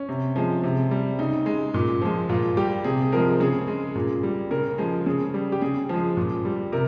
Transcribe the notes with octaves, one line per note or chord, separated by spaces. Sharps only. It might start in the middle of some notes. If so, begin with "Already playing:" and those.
Already playing: C#4
C3
F3 G#3
C3
G3
C#3 D#4
G#3
A#2
F3 G#3
A#2 F4
G3 G4
C3 G#4
G#4
F3 G#3 A#4
C#3 G#4
G#3
A#2
G3
C#3 A#4
F3 G#3
C#3 G#4
G3
G4
C#3 G#4
F3 G#3
A#2
G3
C3 A#4